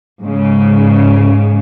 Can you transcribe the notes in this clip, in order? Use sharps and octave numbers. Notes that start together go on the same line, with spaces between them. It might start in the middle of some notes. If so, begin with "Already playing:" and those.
G#2 C#3